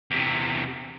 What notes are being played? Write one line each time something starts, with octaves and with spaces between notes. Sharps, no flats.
E2 C3